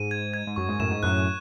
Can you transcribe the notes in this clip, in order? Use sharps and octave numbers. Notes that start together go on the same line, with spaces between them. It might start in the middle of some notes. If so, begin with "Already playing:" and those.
Already playing: G#2 D#7
G#6
G#6
G#2
F#2 C#6
G#2
F#2 A2 E7
G#2
F#2 A2 F#6